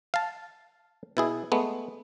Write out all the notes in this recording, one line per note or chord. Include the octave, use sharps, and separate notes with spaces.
F5 A5
B2 E4 G#4
G#3 A3 B3